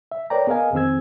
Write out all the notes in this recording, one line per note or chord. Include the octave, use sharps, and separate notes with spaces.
E5
A#4 B4 C#5 D5 G5 A#5
B3 G#4 A#4 D#5 F5 G#5
F2 D#3 C4 G#4 E6 G#6